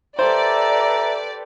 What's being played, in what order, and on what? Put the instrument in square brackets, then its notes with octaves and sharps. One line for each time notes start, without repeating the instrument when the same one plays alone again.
[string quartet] G4 A4 B4 [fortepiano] C5 [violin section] D5 [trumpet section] E5 A#5